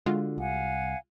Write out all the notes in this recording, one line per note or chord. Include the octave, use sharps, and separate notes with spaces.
D3 G#3 F4 F#4
C2 F5 F#5 G#5